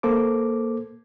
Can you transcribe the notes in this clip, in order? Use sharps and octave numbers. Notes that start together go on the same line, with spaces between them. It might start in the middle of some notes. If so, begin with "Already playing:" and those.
A#3 A4 C5 D6